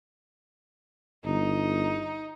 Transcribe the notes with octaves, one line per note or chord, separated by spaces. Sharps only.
G1 D#4